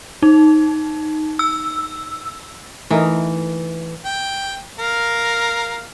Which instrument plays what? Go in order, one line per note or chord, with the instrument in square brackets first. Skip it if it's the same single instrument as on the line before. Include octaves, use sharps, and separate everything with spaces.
[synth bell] D#4
E6
[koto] E3 [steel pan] A3 D#4 A#4
[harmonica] G5
A#4 F5